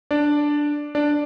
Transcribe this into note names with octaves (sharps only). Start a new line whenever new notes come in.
D4 D5
D4 D5